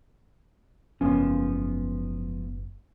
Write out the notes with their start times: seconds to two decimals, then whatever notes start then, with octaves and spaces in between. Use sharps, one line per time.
1.01 F#1 G#2 F3 B3 C#4